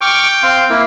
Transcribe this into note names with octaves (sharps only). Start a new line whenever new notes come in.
G5 C#6 D6 F6
C4 F5 C6
A#3 E4